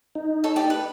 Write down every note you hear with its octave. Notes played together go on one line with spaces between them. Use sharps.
D#4
A4 C#5
G4 D5
B4